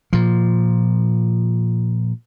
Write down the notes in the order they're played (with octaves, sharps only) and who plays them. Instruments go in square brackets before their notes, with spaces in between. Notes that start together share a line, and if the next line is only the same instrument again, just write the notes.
[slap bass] A#2 F3